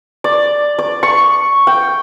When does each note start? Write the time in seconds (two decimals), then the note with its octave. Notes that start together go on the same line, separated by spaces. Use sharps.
0.24 D5
0.79 D5
1.03 C#6
1.67 G5